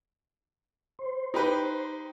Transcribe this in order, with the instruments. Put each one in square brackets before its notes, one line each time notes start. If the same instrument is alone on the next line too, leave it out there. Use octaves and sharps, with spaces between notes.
[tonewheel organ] C5
[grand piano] D#4 G4 B4